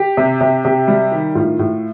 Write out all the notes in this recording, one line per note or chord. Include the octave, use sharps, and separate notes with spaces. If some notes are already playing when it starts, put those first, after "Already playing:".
Already playing: G4
C3
C3
C3 G4
G3
D#3
A2 F4
A2